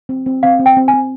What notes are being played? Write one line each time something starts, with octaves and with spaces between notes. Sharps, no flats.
C4
C4
C4 F5
C4
G5
C4
G#5
C4